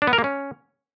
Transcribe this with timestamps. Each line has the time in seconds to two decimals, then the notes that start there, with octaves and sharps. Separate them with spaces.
0.02 D4
0.07 B3
0.13 A#4
0.18 A#3
0.24 C#4